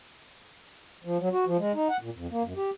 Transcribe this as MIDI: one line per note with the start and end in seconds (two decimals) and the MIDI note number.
1.04 1.18 53
1.19 1.29 54
1.32 1.45 66
1.46 1.57 53
1.58 1.72 56
1.74 1.88 63
1.89 1.97 78
2.01 2.10 46
2.16 2.27 41
2.31 2.43 58
2.43 2.53 42
2.56 2.70 67